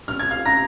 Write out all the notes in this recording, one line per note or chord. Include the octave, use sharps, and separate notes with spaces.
F6
G#6
F5 F6
A#5 A#6